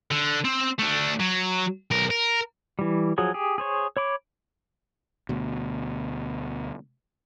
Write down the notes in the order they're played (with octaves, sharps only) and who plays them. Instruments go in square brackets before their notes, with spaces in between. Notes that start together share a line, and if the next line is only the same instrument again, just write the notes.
[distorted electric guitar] D3
C4
A3 D4
F#3
B1 A#4
A#4
[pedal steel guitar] E3 G3
F3 F#3 G#4 G#5
G4 G#4
G#4 C5 C#5
C#5 B5 D6
[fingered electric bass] D2 B2